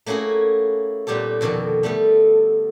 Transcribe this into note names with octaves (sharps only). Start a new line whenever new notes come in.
A3 A#3 C#4 E4 F#4 G#4
A#2 G3 B3 G4 A4
F2 B2 D3 D#3 A4
G3 A3 B3 A4